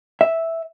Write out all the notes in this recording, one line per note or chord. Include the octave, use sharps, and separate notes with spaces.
E5